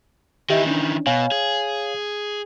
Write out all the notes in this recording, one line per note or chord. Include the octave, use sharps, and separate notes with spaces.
D#3 E3 G4 D#5 E5
C#4 D4
B2 C#5 F5 G#5
G#4